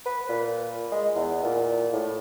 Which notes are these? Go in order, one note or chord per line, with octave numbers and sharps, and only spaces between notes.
B4
A#2
G#3
E2
A#2
A2